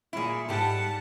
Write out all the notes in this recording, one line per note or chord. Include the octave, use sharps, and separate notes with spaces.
A#2 E4 G#4
G#2 G3 G4 A4 F#5 G5 A5